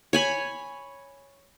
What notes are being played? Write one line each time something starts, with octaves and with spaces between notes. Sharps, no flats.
C#5 G#5 B5